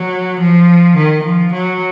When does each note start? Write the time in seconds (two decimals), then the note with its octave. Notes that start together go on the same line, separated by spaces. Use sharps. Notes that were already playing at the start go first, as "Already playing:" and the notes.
Already playing: F#3
0.40 F3
0.96 D#3
1.24 F3
1.52 F#3